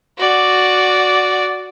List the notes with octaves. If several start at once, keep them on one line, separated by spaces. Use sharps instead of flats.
F#4 D5